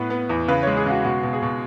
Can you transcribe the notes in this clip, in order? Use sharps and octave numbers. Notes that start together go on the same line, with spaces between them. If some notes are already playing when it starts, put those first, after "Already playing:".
Already playing: A2 B3 B4
B3
E2
C#3 B4
G#3 C#5
G#4
C#3 F#4
B2 F#4
B2
G#4
B2